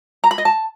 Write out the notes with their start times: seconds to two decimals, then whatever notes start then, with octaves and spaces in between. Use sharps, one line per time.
0.24 A#5
0.31 B5
0.38 D#5
0.45 A5